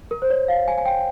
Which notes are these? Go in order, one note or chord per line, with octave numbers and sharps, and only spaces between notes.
A#4
C5
C#5
F5
G#5
G#5
G5